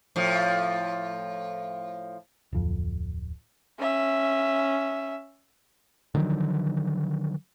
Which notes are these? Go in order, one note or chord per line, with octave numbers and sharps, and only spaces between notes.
A2 F3
D1 F2
C#4 E5
D3 D#3 F3 F#3